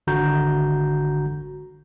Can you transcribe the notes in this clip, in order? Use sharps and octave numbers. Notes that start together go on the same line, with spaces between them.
G#1 D3 F#4 A#5 G6